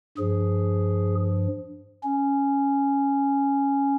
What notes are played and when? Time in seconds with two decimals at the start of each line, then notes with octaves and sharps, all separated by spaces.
0.18 G2 F3 G#4
2.03 C#4